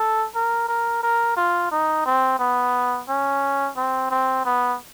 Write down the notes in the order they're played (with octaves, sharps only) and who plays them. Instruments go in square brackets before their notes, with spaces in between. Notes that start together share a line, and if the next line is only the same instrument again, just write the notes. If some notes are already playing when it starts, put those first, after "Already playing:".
Already playing: [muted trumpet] A4
A#4
A#4
A#4
F4
D#4
C4
B3
C#4
C4
C4
B3